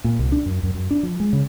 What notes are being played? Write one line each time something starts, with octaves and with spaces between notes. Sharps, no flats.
A#2
C2
D4
F#2
F#2
F#2
D4
F3
G#3
C#3